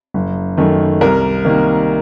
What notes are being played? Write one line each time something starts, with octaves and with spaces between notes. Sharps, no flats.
F#1
F#2 D#3 A3
C2 A#4
C3 D#3 A#3